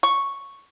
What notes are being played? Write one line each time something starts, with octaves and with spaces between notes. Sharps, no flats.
C#6